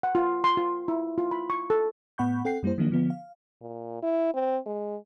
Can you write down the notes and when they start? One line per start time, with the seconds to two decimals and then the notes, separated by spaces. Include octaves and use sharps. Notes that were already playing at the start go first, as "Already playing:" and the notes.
0.03 F#5
0.15 F4
0.44 C6
0.57 F4
0.88 E4
1.18 F4
1.31 B5
1.50 C#6
1.70 A4
2.18 A2 B3 F#5 B5 C#6 G6
2.45 C4 A4 F#5 G5 C7
2.63 F#2 G3 A#3 E4 C5
2.78 D#3 F3 F#3 A#3 D4
2.90 D3 F3 B3
3.10 F5
3.61 A#2
4.03 E4
4.34 C4
4.66 G#3